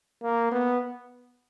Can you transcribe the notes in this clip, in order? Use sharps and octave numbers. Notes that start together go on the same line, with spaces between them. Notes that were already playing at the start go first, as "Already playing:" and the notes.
A#3
B3